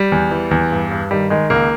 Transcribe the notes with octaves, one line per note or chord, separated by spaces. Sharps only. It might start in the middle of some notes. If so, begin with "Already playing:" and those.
Already playing: G3
E2
E3
E2
G2
G2
D#3 G3
D#3 G#3
C#2 A#3